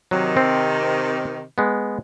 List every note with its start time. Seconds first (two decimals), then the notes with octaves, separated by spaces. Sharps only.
0.11 C3 D#3 F#3
0.37 C4
1.58 G#3 B3